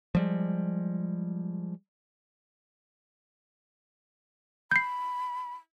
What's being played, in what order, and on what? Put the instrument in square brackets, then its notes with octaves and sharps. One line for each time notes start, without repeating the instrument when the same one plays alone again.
[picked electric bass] F3 G3 G#3
[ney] B5 [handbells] G6 C7